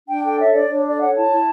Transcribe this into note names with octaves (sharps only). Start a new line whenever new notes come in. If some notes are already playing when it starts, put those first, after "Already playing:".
D4 G5
A4 G5
C#5 E5
D4 D5
D4 C#5
A4 D5
C#5 F#5
E4 A5
E4